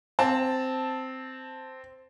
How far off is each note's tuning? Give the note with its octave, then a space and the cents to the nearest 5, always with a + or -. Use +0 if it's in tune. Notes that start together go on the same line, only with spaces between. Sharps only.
C4 -5 A5 +0